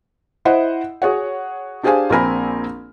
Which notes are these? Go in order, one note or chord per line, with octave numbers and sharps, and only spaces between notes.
E4 C5 D#5 F#5
F#4 G#4 C#5 F#5
D4 G4 G#4 C5 F5 G#5
A#1 A#3 C4 A#4 G#5 B5